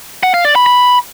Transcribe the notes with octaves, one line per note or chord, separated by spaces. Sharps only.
F#5
F5
D5
B5
B5